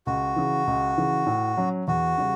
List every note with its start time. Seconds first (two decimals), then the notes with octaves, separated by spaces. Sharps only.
0.06 C#2 F#4
0.36 C#3 E3
0.67 C#2
0.98 C#3 E3
1.27 A2
1.57 F#3 C#4
1.88 E2 F#4
2.18 C#3 G3